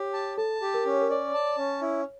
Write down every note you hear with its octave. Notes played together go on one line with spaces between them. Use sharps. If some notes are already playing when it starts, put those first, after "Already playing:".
Already playing: G4 C#5
A5
A4 A5
G4
A#4
C#4
C#5
A#4
C#5 D5
A5
C#4
E4